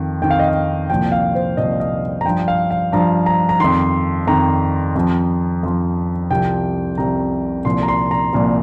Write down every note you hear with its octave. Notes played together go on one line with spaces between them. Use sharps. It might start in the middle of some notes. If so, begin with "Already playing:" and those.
Already playing: F2 D#3
F2 D#3 G5
F5
D#5
F5
C2 A#2 F3 G5
F5
C5
C2 A#2 F3 D#5
D#5
A#5
G2 F3 G5
F5
F5
G2 F3 A#5
A#5
A#5
F2 D#3 C6
F2 D#3 A#5
F2 F3
F2 F3
C2 C3 F3 G5
C2 C3 F3 A#5
C2 A#2 F3 C6
A#5
C6
A#5
C2 A#2 F3